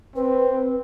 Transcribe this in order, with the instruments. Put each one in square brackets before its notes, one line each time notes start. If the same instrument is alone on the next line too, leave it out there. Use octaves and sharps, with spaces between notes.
[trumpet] C4 [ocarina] B4